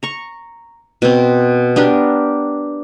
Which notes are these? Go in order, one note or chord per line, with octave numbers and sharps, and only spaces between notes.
A#5 C#6
B2 C4
B3 D4 G4 A#4